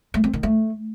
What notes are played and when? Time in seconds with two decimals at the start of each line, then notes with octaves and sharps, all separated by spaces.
0.14 A3
0.24 C4
0.33 D#3
0.43 A3